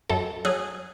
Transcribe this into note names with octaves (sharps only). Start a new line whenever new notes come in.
F#2 A4
F#3 G#4